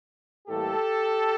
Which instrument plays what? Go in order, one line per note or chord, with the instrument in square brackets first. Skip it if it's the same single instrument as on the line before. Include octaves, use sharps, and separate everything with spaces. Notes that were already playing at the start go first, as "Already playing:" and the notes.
[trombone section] A2 E3 G3 A#3 G4 A4